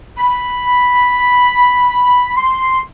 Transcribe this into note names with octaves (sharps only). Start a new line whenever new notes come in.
B5
C6